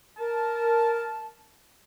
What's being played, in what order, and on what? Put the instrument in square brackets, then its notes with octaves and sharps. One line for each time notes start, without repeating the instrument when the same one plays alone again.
[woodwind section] A#4 A5